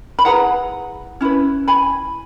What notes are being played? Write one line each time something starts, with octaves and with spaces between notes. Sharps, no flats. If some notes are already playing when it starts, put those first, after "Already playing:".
B5
E4 G#4 B4 F#5 A#5
C#4 E4 B4
G#5 B5